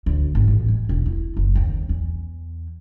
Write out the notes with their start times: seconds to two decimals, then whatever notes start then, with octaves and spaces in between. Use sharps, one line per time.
0.06 D2
0.35 G#1
0.48 A1
0.68 G#3
0.89 E1
1.06 E4
1.37 F#1
1.56 D#2
1.89 E2